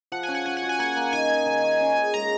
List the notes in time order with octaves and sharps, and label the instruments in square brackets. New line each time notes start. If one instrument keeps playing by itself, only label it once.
[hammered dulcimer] F3 [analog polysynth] F#5
[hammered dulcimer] C#4 [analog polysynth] G#5
[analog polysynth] F#5
[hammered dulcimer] C#4 [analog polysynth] G#5
[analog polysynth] F#5
[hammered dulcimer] F#4
[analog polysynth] G#5
[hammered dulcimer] A#3 [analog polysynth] F#5
[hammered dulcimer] A#3
[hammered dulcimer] D#3 [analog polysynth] G#5
[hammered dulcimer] D#4
D#3
C#4
C#4
G#4
[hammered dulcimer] G#3 [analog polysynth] A#5